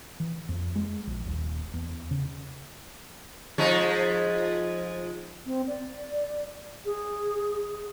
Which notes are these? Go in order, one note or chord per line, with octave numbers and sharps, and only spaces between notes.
E3
F2
G#3
A#1
D#1
E2
C#3
F3 G#3 D#4
C4
D5
G#4